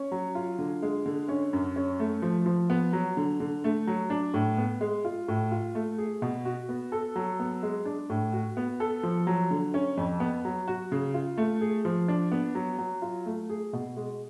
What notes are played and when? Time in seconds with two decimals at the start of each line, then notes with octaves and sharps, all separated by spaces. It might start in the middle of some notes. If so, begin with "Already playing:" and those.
Already playing: C#4
0.12 F#3
0.35 F4
0.59 D3
0.82 G#3
1.06 D3
1.28 C#4
1.53 F#2
1.76 C#4
1.99 A3
2.22 F3
2.46 F3
2.70 B3
2.93 F#3
3.17 D3
3.40 D3
3.64 A3
3.87 F#3
4.10 D4
4.34 A2
4.58 B3
4.81 G#3
5.05 F4
5.28 A2
5.51 F4
5.75 A3
5.98 G#4
6.22 B2
6.45 F#4
6.69 B3
6.92 A4
7.16 F#3
7.40 B3
7.63 G#3
7.85 D4
8.10 A2
8.33 F#4
8.57 B3
8.80 A4
9.03 F3
9.27 F#3
9.51 D3
9.74 C#4
9.97 F2
10.20 B3
10.45 F#3
10.68 F#4
10.92 C#3
11.14 F4
11.38 A3
11.61 G#4
11.85 F3
12.08 D4
12.32 B3
12.55 F#3
12.78 F#3
13.02 F4
13.26 A3
13.50 G#4
13.73 B2
13.97 G#3